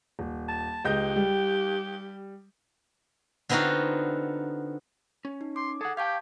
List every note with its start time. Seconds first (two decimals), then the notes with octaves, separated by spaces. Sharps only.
0.19 D#1
0.48 A5
0.85 C#2 G4 D#5 G6
1.16 G3
3.49 D3 B3 C4 D#4 F4 F#4
5.25 C#4
5.41 D#4
5.56 C6 D6
5.81 G#4 A4 F#5
5.97 G4 F5 G5 A5 C#6 G#6